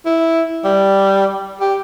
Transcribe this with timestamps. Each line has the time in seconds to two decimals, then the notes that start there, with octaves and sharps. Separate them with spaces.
0.06 E4
0.64 G3
1.60 G4